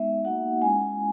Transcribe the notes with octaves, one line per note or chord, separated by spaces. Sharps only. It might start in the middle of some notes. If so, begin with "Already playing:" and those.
Already playing: G#3 B3 D#4 E5
A#3 D#4 F#4 F#5
G#3 C#4 E4 G#5